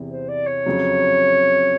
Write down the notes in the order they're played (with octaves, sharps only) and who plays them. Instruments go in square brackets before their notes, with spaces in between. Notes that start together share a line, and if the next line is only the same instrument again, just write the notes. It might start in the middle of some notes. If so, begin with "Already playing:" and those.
Already playing: [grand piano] E2 C3 E3
[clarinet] C5
D5
C#5
[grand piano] F2 C#3 F#3